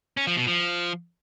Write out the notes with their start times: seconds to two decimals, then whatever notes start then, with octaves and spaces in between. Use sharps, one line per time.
0.17 C#4
0.27 F3
0.37 B2
0.47 F3